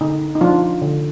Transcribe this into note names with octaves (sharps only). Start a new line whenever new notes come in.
D3 D#4
D#4
F3 D4 F4
D3